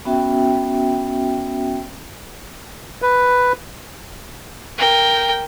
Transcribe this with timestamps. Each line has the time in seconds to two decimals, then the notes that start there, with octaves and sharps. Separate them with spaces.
0.05 B3 C#4 F#4 E5 G5
3.02 B4
4.78 A#4 G5